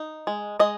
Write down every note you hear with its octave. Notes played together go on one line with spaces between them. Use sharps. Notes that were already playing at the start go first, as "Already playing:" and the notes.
Already playing: D#4
G#3
G#3 D#5